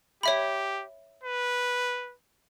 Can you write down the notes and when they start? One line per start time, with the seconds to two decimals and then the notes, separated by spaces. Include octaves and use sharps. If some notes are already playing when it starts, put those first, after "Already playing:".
0.23 G4 C#5 E5 B5
1.23 B4